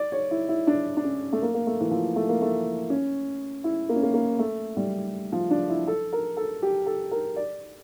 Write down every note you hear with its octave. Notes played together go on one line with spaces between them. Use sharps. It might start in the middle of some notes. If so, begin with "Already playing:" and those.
Already playing: D5
C#5
E4
E4
D4
D4
C#4
A3
A#3
A#3
A3
E3
F3
A3
A#3
A3
C#4
E4
A#3
C#4
A#3
A#3
A3
G3
F3
D4
E4
A4
A#4
A4
G4
A4
A#4
D5